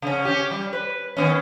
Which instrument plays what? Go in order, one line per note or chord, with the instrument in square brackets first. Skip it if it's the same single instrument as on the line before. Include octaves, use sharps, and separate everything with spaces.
[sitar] C#3 C#4
C#4 G4
G3
B4
D#3 B3 C#4